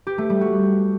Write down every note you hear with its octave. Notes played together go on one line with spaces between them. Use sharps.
G4
A3
G3
F#4